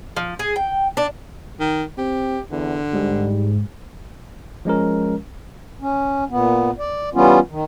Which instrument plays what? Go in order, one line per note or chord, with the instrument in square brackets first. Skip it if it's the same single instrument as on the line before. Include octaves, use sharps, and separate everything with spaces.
[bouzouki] F3
G#4
G5
D4
[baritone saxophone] D#3
[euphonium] C4 [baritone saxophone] G4
[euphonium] E2 [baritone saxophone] D3
[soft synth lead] G#2 [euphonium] G3
[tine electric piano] F3 G#3 C#4 A#4
[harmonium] C#4
A#2 B3
D5
E3 G3 B3 C#4 F4
D#3